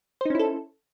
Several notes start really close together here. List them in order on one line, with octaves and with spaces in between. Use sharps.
C5 D#4 C#4 E4 A4